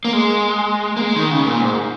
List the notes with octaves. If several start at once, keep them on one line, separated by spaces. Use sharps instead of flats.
A#3
G#3
A#3
G#3
D#3
C#3
A#2
G#2